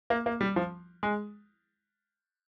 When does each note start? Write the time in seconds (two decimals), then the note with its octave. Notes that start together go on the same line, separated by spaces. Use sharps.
0.10 A#3
0.26 A#3
0.41 G3
0.56 F3
1.03 G#3